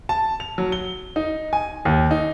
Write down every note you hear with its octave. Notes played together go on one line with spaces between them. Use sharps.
A5
F7
F#3
G7
D#4
G#5
D#2
D#4